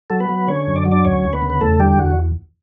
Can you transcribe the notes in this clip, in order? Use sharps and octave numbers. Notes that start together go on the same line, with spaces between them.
F#3 A4
B3 B4
F#3
D3 C#4 C#5
F#2
D5
F#3
D4 D5
D2 C#4 C#5
D2
B3 B4
C#3
B4
E2 A3 A4
D3 G3 G4
E2 F#4